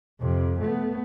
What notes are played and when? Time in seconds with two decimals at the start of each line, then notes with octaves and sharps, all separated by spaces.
0.21 F2 C3
0.61 A3 B3